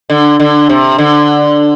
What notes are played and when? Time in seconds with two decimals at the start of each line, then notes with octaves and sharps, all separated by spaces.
0.10 D3
0.40 D3
0.69 C3
0.98 D3